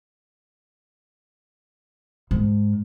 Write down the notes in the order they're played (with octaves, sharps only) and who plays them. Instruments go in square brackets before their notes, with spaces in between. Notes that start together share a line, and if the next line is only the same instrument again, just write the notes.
[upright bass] G#2